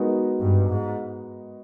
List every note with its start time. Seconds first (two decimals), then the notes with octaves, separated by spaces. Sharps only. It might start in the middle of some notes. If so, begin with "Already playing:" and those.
Already playing: G#3 B3 D#4 F#4 A#4
0.40 G2
0.69 G#2